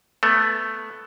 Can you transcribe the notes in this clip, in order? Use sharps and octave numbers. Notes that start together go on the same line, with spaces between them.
A3 B3